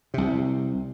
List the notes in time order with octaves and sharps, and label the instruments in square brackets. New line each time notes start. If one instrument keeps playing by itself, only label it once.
[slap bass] C2 C3